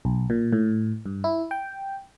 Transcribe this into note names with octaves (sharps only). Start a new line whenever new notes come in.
B1
A#2
A2
G2
E4
G5